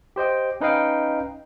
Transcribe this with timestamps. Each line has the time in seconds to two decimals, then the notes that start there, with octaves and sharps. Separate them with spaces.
0.16 G4 C5 D#5 G5
0.61 C#4 D#4 B4 D#5 F5 G5